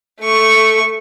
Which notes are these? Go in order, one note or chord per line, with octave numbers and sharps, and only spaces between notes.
A3 C#6